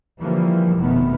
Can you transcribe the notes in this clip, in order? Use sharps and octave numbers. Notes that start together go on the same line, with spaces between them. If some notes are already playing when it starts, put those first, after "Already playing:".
D3 E3 F3 G3 A#3
F1 B2 D#3 A3 B3